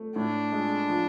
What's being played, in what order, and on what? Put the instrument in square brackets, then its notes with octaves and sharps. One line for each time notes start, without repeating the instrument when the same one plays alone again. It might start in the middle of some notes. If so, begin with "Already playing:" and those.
Already playing: [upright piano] A3
[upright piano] A2 [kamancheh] D4
[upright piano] G#3
F3